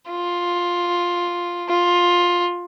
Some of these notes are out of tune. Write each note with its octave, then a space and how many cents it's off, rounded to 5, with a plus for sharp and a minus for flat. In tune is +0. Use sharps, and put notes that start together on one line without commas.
F4 +5
F4 +10